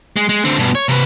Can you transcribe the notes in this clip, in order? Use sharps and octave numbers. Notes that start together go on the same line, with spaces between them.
G#3
G#3
D3 C4
G2 B2
C#5
C3 B4